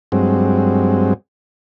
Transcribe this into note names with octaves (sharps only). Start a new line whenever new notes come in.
G2 F#3 G#3 C4